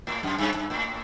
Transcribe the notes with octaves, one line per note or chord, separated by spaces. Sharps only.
A2
F#2
G2
G2
A2